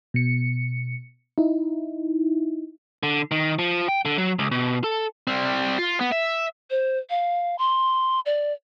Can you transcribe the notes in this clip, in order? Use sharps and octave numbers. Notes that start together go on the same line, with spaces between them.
B2 C#7
D#4 E4
D3
D#3
F3
G5
D3
F#3
C#2
B2
A4
G3 C4
F4
B3
E5
C5
F5
C6
D5